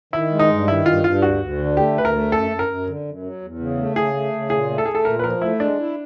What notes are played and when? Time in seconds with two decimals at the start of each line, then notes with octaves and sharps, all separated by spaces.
0.13 D#3 E4
0.31 G#3
0.39 D#4
0.49 G2
0.67 D#3 E4
0.85 G2 F4
1.04 G2 F4
1.22 D2 F#4
1.40 D2
1.58 D3
1.76 A3 G4
1.96 D2 B4
2.05 A#4
2.14 A3
2.31 F#2 A4
2.50 F#2
2.59 A#4
2.68 F#2
2.87 D3
3.05 F#2
3.23 F#3
3.41 E2
3.59 C#3
3.77 A3
3.96 C#3 G#4
4.14 A3
4.33 C#3
4.50 A#2 G#4
4.69 A3
4.78 A4
4.85 A3 G#4
4.95 A4
5.05 A#2 A#4
5.19 B4
5.24 F3 A#4
5.41 A3 E4
5.60 G#3 D4
5.79 E4